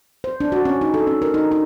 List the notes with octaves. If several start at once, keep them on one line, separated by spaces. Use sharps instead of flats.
C5
D4
F#4
C#4
D#4
A4
C#4
A#4
D#4
D#4